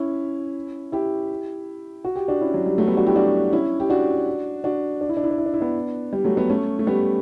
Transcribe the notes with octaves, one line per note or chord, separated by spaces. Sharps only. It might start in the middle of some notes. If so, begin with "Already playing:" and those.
Already playing: C#4 E4
E4 G4
F#4
G4
D4 F#4
C#4 E4
F#3
G3
F#3 A3
G3 B3
D4 F#4
E4 G4
D4 F#4
C#4 E4
G4
D4 F#4
D4 F#4
D4
E4
D4
E4
D4
E4
D4
E4
B3 D4
G3
F#3 A3
G3 B3
A3 C#4
A3
G3 B3